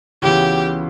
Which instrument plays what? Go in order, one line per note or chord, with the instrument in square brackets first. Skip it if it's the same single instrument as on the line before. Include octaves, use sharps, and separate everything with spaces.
[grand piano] C#2 C#3 E3 B3 F#4 [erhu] G4